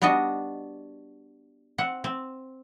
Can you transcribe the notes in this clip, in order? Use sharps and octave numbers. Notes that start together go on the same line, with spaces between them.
G3 B3 D4 F#4 D#5
C4 F#5
C4